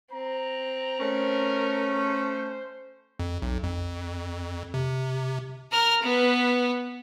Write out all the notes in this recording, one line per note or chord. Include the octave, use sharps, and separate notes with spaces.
C4 A#5
A3 C#4 A#4
C5
F2
B1
F2
C3
A#4 F6
B3 B4